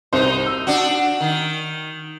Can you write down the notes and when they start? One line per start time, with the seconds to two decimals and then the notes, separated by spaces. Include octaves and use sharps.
0.13 C2 D#4 C5
0.46 E6
0.67 D4 F#4
1.21 D#3